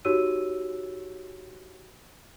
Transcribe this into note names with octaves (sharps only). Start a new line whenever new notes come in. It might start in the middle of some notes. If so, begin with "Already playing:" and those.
D#4 F#4 G4 C#5 E6 D#7